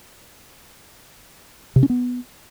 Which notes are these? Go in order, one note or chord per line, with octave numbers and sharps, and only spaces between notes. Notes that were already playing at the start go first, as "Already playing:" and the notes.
C3
C#4
B3